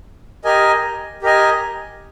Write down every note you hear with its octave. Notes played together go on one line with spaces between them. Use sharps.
G4 A#4 D#5 G#5
G4 A#4 D#5 G#5